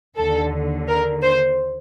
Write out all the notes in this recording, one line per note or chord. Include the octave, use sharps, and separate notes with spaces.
D#2 D3 A4
A#4
C5